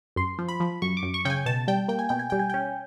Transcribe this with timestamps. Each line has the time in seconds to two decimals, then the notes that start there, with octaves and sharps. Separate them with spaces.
0.16 F#2 C6
0.39 F3
0.48 B5
0.60 F3
0.82 F#2 C#6
0.97 D6
1.03 F#2
1.14 C#6
1.25 C#3 G5
1.30 G#5
1.46 B2 A5
1.68 G3 G5
1.88 A#3 G5
1.99 G#5
2.09 B2 G5
2.19 G#5
2.30 G3 G5
2.39 G#5
2.50 C#4 G5